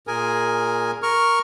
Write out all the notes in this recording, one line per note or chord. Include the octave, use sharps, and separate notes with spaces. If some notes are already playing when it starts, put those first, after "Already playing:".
A#2 G#4 A#4 G#5
A#4 C#6 F6